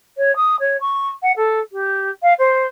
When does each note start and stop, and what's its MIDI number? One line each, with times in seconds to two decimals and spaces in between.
0.17 0.34 73
0.36 0.55 87
0.59 0.77 73
0.80 1.08 85
1.22 1.32 78
1.36 1.59 69
1.72 2.10 67
2.22 2.33 77
2.38 2.66 72